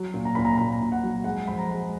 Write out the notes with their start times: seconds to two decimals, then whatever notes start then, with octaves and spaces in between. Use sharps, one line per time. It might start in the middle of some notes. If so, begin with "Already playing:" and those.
Already playing: F#3
0.14 A#2
0.25 A#5
0.35 A#2 B5
0.45 A#5
0.58 A#2 A#5
0.81 A#2
0.92 F#5
1.03 F#3
1.24 G#3 F#5
1.48 F2 B5
1.59 A#5
1.69 G#3